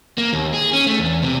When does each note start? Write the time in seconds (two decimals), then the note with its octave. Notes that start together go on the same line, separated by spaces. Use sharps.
0.18 A#3
0.33 D#2
0.54 G#4
0.73 C#4
0.87 A3
0.99 E2
1.22 C3